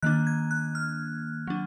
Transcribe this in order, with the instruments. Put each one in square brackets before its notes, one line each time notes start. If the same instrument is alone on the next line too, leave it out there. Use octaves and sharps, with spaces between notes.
[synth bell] D#3 A#3 D4 F#6
G#6
F#6
F6
F#3 D4